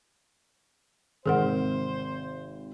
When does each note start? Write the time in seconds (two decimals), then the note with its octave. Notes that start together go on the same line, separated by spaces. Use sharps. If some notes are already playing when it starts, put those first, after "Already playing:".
1.26 G#1 C3 G#4 A#4 C5 F#5